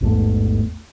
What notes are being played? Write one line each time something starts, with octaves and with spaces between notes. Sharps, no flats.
A1 E2 G#2 A3